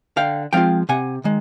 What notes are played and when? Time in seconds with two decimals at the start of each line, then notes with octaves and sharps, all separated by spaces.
0.16 D3 F5 G5
0.53 F3 G#3 C4 F4 F5 G5
0.89 C3 F#5 G#5
1.24 D#3 G#3